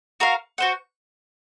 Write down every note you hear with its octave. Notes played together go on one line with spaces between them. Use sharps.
F#4 A#4 F5
F#4 C5 F#5